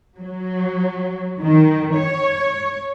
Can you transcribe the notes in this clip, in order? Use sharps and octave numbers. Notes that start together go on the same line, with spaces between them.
F#3
D#3
C#5